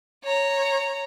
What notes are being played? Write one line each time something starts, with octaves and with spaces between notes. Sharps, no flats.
C#5 A#5